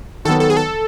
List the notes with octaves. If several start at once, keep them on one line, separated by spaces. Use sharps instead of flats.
D#3 F#3 B3 A4
A4
G#4
A4